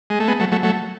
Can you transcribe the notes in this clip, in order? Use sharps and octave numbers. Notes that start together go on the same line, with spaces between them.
G#3
A3
G#3 B3
F#3 A3
F#3 A3
F#3 A3